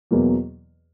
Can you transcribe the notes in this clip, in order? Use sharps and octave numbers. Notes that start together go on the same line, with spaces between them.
E2 B2 F#3 A#3